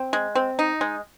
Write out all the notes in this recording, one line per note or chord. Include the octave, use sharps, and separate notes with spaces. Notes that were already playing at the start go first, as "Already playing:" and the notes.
Already playing: C4
G#3
C4
D#4
G#3